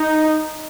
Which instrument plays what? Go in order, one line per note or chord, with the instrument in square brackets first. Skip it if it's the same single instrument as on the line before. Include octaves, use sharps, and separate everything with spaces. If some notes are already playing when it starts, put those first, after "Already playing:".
Already playing: [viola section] D#4